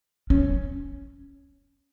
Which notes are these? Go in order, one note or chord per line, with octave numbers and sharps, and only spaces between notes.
C#4